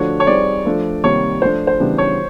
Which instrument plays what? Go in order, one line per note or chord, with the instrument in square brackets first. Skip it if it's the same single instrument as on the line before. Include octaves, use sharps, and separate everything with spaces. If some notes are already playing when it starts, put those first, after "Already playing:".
Already playing: [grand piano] D3 F3 A3 D4 F#4 [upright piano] C#5
[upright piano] C#5
[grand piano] G3 C4 D#4 G#4 [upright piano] D5
[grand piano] F3 A3 D4
[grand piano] C3 D#3 G3 A#3 [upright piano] C#5
[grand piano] F3 A3 D4 [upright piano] C5
[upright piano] C5
[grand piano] C#3 E3 G3 B3 D4
[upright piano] C#5